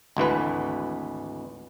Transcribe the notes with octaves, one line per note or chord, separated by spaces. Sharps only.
G#1 D2 E3 B4